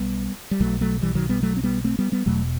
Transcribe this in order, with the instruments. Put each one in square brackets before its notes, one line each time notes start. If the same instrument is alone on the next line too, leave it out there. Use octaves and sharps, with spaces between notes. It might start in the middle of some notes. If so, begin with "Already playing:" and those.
Already playing: [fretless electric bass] B1 B2 G3 B3
G3
B1 B2 F#3 A3
F#3 A3
E3 G3
D#3 F#3
G3 B3
F#3 A3
C4
G3 B3
A3 C4
G3 B3
G3 B3
E1 E2 B2 F#3 A3